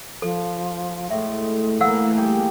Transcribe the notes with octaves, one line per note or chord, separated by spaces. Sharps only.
F3 A4
A2 G#3 A3 E5
E3 A3 A#3 F5 F#5 E6
G3 G4 G#4 G5